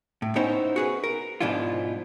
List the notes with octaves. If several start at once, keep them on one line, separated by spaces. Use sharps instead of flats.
A2
B3 C#4 D#4 E4 C5 C#5
F#4 G#4 B4
A#4
G#2 B2 F3 D4 E4 F4